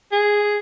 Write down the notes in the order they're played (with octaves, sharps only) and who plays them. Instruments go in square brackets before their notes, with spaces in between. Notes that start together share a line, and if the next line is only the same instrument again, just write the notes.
[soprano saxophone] G#4